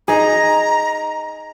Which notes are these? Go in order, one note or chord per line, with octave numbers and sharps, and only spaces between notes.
D#4 G#4 A#5